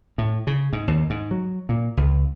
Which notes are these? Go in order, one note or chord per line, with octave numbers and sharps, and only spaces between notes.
A2
C#3
G#2
D#2
G#2
F#3
A#2
C#2